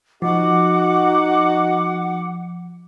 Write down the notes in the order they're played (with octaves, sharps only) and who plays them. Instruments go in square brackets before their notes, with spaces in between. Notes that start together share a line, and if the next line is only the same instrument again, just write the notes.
[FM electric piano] F3 [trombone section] D#4 F#4 [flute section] F#5 D6